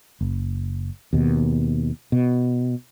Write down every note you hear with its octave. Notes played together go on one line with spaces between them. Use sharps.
F#1
D#2 B2
B2